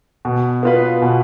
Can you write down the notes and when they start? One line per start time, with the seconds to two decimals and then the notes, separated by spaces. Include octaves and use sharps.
0.25 B2
0.63 B3 F4 B4
1.02 B2